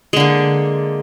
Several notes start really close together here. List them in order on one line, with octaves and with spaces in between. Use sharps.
G#3 D3 A#3